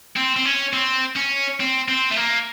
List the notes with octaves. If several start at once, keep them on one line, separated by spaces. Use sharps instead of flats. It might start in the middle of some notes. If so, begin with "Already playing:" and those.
C4
C4
C#4
C4
C#4
C4
C4
A3
A#3